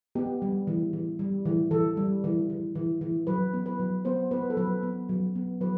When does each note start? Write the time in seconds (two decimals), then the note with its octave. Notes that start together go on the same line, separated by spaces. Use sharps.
0.15 B3 G4
0.42 G3
0.67 E3
0.93 E3
1.19 G3
1.45 E3
1.71 E3 A4
1.97 G3
2.24 E3
2.50 E3
2.75 E3
3.01 E3
3.27 F#3 B4
3.53 B3
3.66 B4
3.79 F#3
4.05 B3 C5
4.31 B3 B4
4.50 A4
4.57 F#3 B4
4.83 B3
5.09 F#3
5.35 B3
5.61 F#3 B4